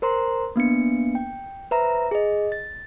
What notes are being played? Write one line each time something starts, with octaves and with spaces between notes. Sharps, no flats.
A#4 C5 A#5 C6
A#3 B3 D4 C#7
G5
B4 C5 E5 A#5
G#4 D#5
A6